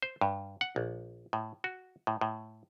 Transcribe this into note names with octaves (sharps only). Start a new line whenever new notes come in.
C5
G2
F#5
A#1
A2
F#4
A2
A2